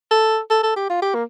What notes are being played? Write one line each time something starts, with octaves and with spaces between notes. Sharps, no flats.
A4
A4
A4
G4
F4
G4
A#3